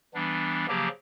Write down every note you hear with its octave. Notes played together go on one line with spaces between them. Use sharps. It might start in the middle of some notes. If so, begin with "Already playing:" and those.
E3 G3 B3 D4
C#3 F3 F#3 A#3 G4